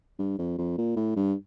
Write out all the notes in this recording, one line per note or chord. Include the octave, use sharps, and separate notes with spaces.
G2
F2
F2
A#2
A2
G2